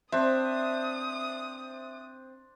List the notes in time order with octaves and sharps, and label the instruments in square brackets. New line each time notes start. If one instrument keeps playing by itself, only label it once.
[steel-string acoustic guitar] C4 [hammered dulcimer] D4 C5 [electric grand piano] E5 [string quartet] D#6